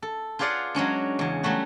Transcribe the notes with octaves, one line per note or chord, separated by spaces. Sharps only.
A4
F4 G#4 B4 D5 F5 F#5
F#3 G#3 C#4 D4
E2 C#3
F#3 G3 A3 F#4